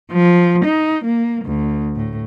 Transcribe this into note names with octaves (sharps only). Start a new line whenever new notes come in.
F3
D#4
A#3
D2
A2